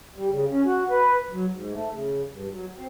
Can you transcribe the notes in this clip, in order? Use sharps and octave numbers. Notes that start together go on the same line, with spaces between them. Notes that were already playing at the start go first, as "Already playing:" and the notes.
G3
C#3
C#4
F#4
B4
F#3
G#2
A3
C#3
G2
F#3
C4